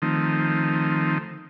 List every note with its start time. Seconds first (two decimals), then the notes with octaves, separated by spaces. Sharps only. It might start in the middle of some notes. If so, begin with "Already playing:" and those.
0.02 D#3 F3 A3 C4 D#4